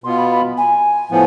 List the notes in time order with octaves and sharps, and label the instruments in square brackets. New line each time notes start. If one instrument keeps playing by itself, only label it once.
[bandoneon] B2 B3 F4 [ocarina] C6
[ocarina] B5
B5
G#5
[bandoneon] A2 F3 B3